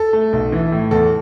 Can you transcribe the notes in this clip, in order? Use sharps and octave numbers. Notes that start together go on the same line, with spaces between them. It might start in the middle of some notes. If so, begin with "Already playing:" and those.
Already playing: A4
A3
B1
E3
A2
E2 A4